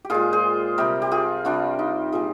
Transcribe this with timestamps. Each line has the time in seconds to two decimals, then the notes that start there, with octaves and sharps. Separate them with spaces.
0.05 G4
0.10 A#2 G#3 F4 G#4
0.33 G#4 C5
0.78 C3 G3 G4 A#4
1.02 G4
1.11 F4 G#4
1.45 C3 G3 D4 F4
1.79 D#4 G4
2.12 A#2 G3 F4 G#4